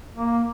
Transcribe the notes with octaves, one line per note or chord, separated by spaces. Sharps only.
A#3